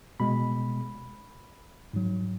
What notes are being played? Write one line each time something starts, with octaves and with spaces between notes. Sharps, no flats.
B2 G#3 B5
G#2 F#3